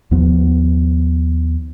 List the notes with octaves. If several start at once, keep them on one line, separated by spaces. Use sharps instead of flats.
D#2 F3 B3